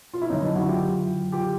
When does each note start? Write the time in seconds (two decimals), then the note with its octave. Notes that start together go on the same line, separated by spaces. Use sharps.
0.14 F4
0.22 E4
0.30 F2 D3 F#3 C#4 D#4
0.42 D4 E4
0.55 E4 F#4
0.68 F4 G4
1.32 F4 G4